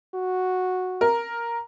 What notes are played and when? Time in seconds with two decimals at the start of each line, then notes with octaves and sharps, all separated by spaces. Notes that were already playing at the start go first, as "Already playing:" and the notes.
0.15 F#4
1.01 A#4